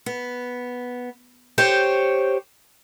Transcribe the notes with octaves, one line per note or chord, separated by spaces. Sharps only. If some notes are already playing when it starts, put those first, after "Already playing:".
B3
G4 C5 C#5